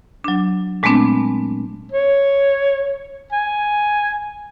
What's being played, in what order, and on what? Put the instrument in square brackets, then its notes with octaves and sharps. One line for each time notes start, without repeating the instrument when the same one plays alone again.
[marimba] F#3 D4
A#2 G#3 A3 B3 C4 D4
[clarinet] C#5
G#5